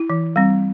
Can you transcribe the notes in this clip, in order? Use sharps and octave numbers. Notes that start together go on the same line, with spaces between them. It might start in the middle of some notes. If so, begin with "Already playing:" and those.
Already playing: E4
E3
G3 C4